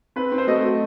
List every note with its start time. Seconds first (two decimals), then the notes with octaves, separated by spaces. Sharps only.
0.16 C4 B4
0.32 C4
0.38 C5
0.47 A3 D#5
0.63 F#3